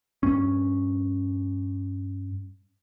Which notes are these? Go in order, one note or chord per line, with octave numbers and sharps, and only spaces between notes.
G2 C#4